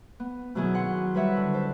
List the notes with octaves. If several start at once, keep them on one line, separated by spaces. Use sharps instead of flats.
B3
B2 D#3 F#3 B3 E4 G#4
F#5 C6
G3 B4 C#5 E5 F#5
D3
A4 C5